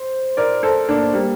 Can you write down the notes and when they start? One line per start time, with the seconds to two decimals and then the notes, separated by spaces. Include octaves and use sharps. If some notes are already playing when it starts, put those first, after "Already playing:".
Already playing: C5
0.37 A#4 D5
0.63 A4 C5
0.89 A#3 D4
1.14 G3 A#3